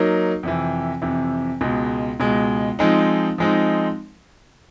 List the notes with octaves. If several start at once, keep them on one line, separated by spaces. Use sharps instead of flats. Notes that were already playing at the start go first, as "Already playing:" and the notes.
Already playing: F#3 A#3 D#4
F2 C3 E3
F2 C3 E3
C#2 B2 G#3
C#2 B2 G#3
F3 G#3 C4 D#4
F3 G#3 C4 D#4